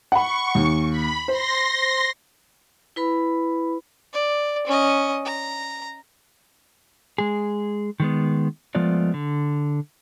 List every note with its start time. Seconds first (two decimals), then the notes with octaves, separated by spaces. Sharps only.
0.12 F#5 B5 C#6
0.55 D#2
0.90 B5
1.28 C5 C6 A#6
2.96 E4 B4 B5
4.13 D5
4.67 C#4 D#5
5.25 A#5
7.18 G#3 G#4
8.00 D#3 G#3 B3
8.75 F3 G#3 A3 B3 F4 D5
9.14 D3